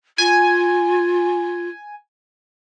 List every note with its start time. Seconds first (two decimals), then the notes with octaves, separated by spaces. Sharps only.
0.18 F4 G#5